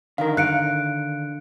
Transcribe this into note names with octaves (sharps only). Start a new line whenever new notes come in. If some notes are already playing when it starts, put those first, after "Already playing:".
D3 D#3 A#4 F5
F5 F#6 C#7 D7